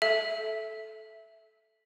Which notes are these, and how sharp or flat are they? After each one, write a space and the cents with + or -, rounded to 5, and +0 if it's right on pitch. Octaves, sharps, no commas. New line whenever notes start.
A4 -15 E5 +0